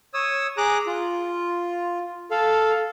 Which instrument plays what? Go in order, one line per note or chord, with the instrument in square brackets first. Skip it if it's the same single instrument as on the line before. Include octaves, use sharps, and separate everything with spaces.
[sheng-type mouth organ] C#5 D#6 E6
G#4 A#5 D6 F#6
F4
A4 F5